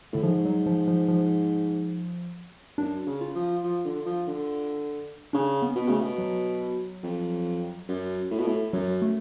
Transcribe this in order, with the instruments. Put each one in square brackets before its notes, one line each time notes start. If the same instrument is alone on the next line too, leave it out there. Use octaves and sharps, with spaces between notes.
[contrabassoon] A2 [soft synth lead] D3
[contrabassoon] G#2 [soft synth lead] F3
[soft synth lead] F#3
F3
F3
F3
[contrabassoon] F#2 [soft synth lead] D4
[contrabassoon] C#3
[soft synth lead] F4
[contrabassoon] F3
F3
D3
F3
D3
[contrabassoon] C#3 [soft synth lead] D4
[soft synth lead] B3
[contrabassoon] B2
[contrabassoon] C#3 [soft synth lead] A3
[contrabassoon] B2
[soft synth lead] F#3
[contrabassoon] F2
F#2
A2
B2
A2
[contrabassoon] F#2 [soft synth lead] F#3
[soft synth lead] A3